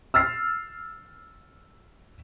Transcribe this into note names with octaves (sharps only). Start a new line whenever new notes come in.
E6 F6 A6 C7